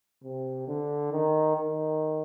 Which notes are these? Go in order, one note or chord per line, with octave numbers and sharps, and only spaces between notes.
C3
D3
D#3
D#3